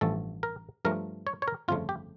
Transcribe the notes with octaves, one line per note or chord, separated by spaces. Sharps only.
A1 G2 F3 A3 A4
A#4
G2 F3 A3 A#4
C#5
C#5
A#4
G1 F2 C#3 F3 A3 F4
G4